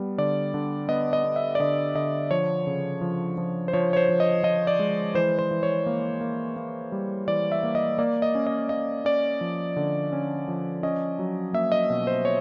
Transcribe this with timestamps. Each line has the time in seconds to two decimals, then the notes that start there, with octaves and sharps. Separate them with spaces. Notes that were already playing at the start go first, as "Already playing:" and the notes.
Already playing: G3 B3
0.18 D3 D5
0.54 D3
0.89 B3 D#5
1.13 D#5
1.24 B3
1.36 E5
1.55 D5
1.60 D3 D#5
1.95 D3 D#5
2.31 F3 C#5
2.67 C#3
3.01 F3
3.38 F3
3.68 C5
3.73 F3 C#5
3.93 C#5
3.97 C5
4.09 F3
4.20 D#5
4.43 F3 D#5
4.67 D5
4.79 G#3
5.14 E3 C5
5.39 C5
5.51 E3
5.63 C#5
5.86 A#3
6.21 A#3
6.56 A#3
6.92 G3
7.28 E3 D5
7.52 E5
7.63 A#3
7.75 D#5
7.98 A#3 D5
8.22 D#5
8.35 C#4
8.47 D#5
8.69 A#3 D#5
9.05 C#4 D5
9.41 F3
9.76 D3
10.13 C#4
10.48 F3
10.83 C#4 D#5
11.19 F#3
11.53 A#3 E5
11.72 D#5
11.90 B2
12.07 C5
12.25 C#5